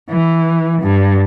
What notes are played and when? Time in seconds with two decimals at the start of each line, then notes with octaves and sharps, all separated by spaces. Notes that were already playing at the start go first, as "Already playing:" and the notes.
0.10 E3
0.82 G2